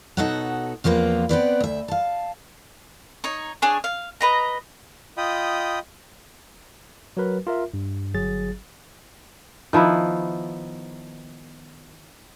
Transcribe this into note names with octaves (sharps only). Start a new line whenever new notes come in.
B2 D#4 F#4 A4 C#5 F#5
E2 F3 A#3 C4 B4
B3 C4 B4 D5
D2 E5
F5 A5
D#4 C#5
D4 G#4 C#5
F5
B4 D#5 A#5
F4 D#5 G5 B5 D#6
F#3 F#4 A#4 B4
F4 A#4 E5
G2
G1 F#3 G#4 A6
D#3 F3 B3 E4